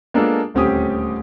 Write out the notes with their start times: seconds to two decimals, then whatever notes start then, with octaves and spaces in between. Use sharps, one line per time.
0.14 G#3 A#3 B3 D4 F4 A4
0.54 D#1 D2 C4 C#4 G4 D#6